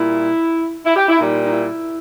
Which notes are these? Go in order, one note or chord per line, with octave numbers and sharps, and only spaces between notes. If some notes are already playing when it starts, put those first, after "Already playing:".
Already playing: A#2 G3 E4
E4
G4
E4
A#2 G3 D#4
D#4
E4